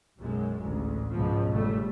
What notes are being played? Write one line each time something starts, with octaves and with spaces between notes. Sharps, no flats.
B1 F#2 G#3
A1 D2
C#2 G#2 B2 F3
G1 C#3 G3 A3